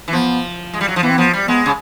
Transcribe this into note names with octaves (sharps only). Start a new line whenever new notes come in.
E3
F3 B3
G#3
G3
F#3
F3
E3 B3
C4
F3 B3
G3
G#3 B3
C#3